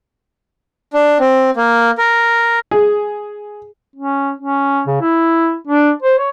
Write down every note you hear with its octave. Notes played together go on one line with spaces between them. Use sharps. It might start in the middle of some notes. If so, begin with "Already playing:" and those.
D4
C4
A#3
A#4
G#4
C#4
C#4
C#3
E4
D4
C5
C#5